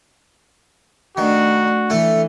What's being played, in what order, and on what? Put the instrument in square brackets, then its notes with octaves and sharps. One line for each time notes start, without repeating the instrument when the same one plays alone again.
[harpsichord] D#3 [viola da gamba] A3 D4 [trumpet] F#4
[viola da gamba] E3 [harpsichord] A3